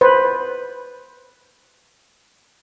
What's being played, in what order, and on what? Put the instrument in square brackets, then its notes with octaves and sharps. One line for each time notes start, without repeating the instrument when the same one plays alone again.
[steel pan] B4 C5